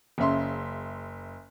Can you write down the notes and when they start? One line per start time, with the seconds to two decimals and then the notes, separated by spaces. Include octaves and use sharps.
0.18 F#1 C#3 E5 C6